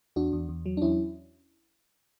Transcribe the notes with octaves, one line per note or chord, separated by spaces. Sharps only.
E2 D4 F#4
E2
E2
F#3
D4
E2 C#4 E4